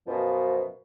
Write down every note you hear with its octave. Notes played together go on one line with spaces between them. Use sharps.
F#2 B2 F3